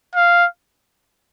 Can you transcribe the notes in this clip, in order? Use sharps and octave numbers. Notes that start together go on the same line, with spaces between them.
F5